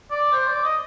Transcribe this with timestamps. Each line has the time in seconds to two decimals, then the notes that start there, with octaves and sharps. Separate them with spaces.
0.11 D5
0.32 C5
0.48 D5
0.64 D#5